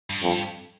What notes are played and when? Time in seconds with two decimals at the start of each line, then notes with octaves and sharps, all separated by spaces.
0.10 G2
0.23 F2